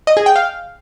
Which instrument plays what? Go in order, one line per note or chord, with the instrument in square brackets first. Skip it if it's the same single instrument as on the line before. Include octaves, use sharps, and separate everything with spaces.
[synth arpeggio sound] D#5
G#4
G5
F5